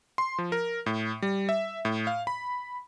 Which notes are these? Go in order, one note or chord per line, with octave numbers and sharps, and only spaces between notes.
C6
F3
A#4
A2
G3
E5
A2
F5
B5